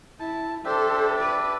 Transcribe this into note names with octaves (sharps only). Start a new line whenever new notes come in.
E4 A5
D4 G4 A4 C5 E5
B4 D5